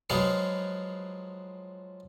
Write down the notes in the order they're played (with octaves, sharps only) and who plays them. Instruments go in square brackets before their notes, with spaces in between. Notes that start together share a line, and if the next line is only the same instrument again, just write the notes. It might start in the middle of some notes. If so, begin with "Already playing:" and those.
[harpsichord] F3 F#3 G#3 F4 G#4 B4